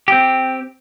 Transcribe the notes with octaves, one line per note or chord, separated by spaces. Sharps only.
C4 G4